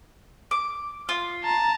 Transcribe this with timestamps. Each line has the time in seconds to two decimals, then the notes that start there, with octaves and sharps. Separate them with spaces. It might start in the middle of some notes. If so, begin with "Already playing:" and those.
0.51 D6
1.09 F4
1.44 A5 A#5